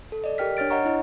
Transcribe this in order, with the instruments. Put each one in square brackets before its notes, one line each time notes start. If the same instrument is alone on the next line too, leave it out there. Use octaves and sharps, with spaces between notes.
[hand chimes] A4
D5 D#5
G4 A#4 G5 F6 B6
D4 C#5 F6 A6 D7
C#5 D#5 F#5 A#5 C#6
D4 E4 D#5